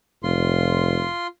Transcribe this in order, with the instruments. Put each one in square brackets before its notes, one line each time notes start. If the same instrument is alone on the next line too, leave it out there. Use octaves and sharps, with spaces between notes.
[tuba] F1 [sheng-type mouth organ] F4 C6